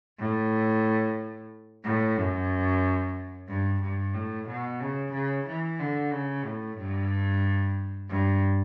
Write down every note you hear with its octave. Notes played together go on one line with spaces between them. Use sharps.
A2
A2
F#2
G2
G2
A2
B2
C#3
C#3
E3
D3
C#3
A2
G2
G2